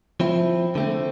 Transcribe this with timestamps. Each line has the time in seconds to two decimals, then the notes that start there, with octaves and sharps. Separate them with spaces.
0.20 F3 C4 E4
0.75 D3 A3 C4